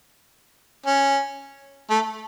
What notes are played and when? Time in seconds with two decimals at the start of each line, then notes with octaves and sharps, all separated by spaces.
0.86 C#4
1.90 A3